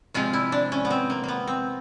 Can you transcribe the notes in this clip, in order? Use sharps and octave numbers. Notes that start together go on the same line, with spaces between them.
C3 F3 G#3 F4
E4
D4
C#4
B3
C4
A#3
A#3 B3
C4